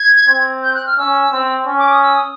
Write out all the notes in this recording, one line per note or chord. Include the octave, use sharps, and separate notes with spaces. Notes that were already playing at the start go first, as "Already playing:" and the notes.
Already playing: G#6
C4
G6
F#6
F6
C#4 E6
C4
C#4
D6
D#6
E6
D#6